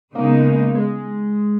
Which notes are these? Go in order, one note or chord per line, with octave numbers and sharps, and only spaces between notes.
C#3 G#3 A#3 B3 D#4
G#3